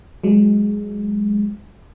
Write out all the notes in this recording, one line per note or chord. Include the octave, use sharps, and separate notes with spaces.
F#3 G#3